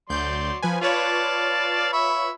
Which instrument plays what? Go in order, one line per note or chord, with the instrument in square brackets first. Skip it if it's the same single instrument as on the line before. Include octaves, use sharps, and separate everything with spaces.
[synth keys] D2 G6 [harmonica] F#3 D5 C6
[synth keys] F3 B4 G#5
[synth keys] F4 B4 C#5 [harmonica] D5 F5 A5
[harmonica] E5 B5 C#6